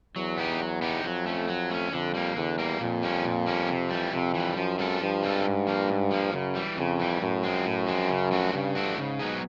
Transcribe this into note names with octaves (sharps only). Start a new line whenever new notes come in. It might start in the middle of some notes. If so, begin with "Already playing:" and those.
E2 F#3
B3 D#4 G4
F#3
B3 D#4 G4
F2 F#3
A3 C#4
F#3
A3 C#4
F2 D3
G3 A#3
E2 D3
G3 A#3
F2 A#2
G3 A#3 C#4
A#2
G3 A#3 C#4
C3
E3 G3
F2 C3
E3 G3
F#2 F3
G#3 C4 F4 A4
G2 F3
G#3 C4 F4 A4
G#2
F3 A#3
G#2
F3 A#3
F#2 C#3
E3 G3
F2 C#3
E3 G3
F#2 A2
F3 G#3 C4
A2
F3 G#3 C4
C#3
F3 A3 D4 F#4
G2 C#3
F3 A3 D4 F#4
G#2 C#3
F#3 B3 D#4 G#4